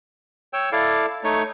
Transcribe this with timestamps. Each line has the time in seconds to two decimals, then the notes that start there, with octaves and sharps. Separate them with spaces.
0.53 C#5 G5 E6
0.72 E4 A4 D5 F5
1.24 A3 D#4 C#5